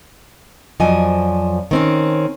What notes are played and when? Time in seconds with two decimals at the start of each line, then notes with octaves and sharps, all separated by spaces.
0.80 F2 F3 F#3 D5 D#5 G#5
1.71 D#3 C4 C#4